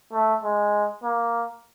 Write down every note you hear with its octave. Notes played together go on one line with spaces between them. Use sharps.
A3
G#3
A#3